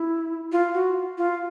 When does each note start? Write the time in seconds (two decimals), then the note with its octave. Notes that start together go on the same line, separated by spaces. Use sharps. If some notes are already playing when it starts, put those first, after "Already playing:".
Already playing: E4
0.52 F4
0.74 F#4
1.18 F4